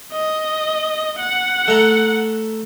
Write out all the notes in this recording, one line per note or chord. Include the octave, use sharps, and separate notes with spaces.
D#5
F#5
A3 A#5